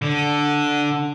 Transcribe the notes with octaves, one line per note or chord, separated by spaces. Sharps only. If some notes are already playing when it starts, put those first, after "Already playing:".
D3